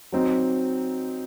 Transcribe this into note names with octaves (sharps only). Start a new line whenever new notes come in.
F#3 C4 D#4